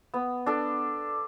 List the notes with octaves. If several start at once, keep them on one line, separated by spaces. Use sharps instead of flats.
B3
D4 A4 D5